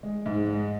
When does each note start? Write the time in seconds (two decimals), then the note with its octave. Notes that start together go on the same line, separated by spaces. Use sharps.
0.03 G#3
0.26 G#2
0.48 G#3